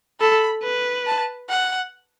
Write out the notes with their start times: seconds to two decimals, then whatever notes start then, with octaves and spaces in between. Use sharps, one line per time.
0.20 A4 B5
0.64 B4
1.07 A5
1.49 F#5